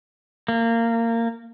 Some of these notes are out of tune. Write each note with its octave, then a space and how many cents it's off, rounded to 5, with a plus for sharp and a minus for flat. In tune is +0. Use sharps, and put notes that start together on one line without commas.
A#3 -20